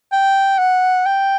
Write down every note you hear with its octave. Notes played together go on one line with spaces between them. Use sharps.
G5
F#5
G5